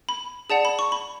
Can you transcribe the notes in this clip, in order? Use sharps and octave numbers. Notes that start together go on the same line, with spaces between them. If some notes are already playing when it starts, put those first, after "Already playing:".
B5
G#4 D5 F#5 A5
B5
C#6
B5